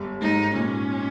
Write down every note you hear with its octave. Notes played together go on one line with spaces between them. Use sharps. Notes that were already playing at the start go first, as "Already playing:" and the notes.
Already playing: G1 G3
G#2 D#4
A#2 C#4